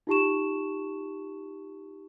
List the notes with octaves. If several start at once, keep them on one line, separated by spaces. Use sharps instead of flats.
D#4 F4 G4 A5 C#6 E7